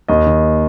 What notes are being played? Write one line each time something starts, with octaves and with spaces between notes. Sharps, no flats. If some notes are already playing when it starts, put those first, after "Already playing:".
D#2 D#5
D#3